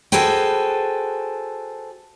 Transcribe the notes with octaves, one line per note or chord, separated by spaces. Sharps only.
F#4 G#4 A4 B4 C5 G5